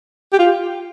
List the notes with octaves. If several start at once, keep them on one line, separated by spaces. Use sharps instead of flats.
G4
F4